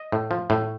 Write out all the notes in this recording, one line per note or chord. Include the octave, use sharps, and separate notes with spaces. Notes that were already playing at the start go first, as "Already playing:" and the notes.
Already playing: D#5
A2
F3
A2